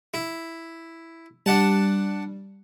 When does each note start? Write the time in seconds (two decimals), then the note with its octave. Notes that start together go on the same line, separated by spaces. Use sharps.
0.14 E4
1.46 G3 D4 F#5 A5